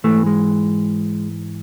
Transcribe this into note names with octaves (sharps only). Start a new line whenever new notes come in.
G#2 E3 A3
G#3